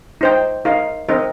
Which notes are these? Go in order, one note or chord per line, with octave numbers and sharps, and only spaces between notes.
D#4 C5 G5
D#4 A#4 F5
C4 D#4 A#4 D#5